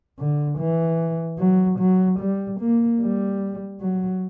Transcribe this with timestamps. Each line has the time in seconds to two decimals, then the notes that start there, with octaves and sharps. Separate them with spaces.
0.19 D3
0.58 E3
1.39 F#3
1.79 F#3
2.19 G3
2.60 A#3
3.01 G3
3.80 F#3